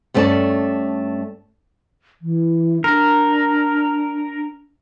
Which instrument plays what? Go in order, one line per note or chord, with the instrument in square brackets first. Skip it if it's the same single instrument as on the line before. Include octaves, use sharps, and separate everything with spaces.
[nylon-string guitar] G2 A3 B3 C#4 D5 A5
[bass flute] E3
[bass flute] D4 [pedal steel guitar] A#4